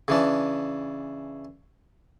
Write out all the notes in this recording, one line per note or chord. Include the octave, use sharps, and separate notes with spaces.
C#3 E3 D4